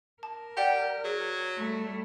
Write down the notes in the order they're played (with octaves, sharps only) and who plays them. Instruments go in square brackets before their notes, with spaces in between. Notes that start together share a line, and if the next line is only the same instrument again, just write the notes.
[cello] A#4 [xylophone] A5
[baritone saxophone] G4 [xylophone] D5 F#5 G5
[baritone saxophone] F#3 [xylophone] G#4
[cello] G3 A3